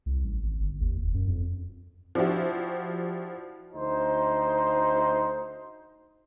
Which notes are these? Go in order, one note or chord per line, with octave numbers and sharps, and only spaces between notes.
C2
A1
G#1
G1
D#2
E1
F#2
F2
F3 D4 E4 F#4 G4
D2 D#4 C5